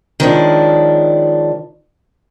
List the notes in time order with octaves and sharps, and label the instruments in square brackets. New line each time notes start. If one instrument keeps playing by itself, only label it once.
[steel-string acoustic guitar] D#3 F3 G#3 C#4 D4 E4